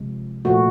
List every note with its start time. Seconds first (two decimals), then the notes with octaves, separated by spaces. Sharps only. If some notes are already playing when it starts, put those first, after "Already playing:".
Already playing: C3 F3 G#3
0.45 A#2 F3 A3 F#4